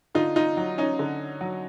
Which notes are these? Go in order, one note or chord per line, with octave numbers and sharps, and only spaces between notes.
D3 D#4 F4
D#4 F4
F#3
C#4 D#4
D3
F#3